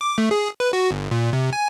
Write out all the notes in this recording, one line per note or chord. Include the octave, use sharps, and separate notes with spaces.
D6
A3
G#4
B4
F#4
G1
A#2
C3
G#5